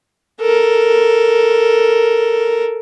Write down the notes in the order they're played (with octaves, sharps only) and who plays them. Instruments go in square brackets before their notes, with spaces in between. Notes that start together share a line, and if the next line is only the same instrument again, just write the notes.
[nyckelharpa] A4 A#4